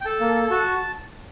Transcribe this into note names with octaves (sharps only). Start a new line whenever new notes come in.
G5
A4 A5
A#3
A4
F#4 A5